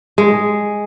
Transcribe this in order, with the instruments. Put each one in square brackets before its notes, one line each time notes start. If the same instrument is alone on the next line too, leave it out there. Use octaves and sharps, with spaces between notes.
[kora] G#3